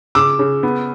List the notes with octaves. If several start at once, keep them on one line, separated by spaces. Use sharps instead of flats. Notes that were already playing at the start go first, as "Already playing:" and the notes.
C#3 D6 E6
C#3
B3